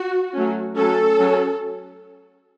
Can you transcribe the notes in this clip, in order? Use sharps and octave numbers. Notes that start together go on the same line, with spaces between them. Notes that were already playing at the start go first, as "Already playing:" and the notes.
Already playing: F#4
F#3 A3 C#4
F#3 A3 C#4 A4
F#3 C#4